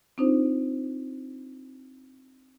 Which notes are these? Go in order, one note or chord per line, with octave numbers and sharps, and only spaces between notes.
C4 D4 D#4 F4 C5